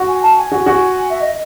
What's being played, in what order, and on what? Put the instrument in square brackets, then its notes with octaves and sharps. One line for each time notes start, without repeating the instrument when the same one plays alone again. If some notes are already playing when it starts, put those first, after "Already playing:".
Already playing: [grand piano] F#4
[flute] G#5
A5
G#5
[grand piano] F#4
F#4
[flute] E5
D#5